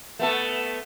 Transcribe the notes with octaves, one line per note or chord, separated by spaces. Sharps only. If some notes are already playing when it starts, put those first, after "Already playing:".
A3 B3 A4